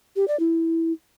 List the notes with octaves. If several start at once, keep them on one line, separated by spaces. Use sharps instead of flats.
G4
D5
E4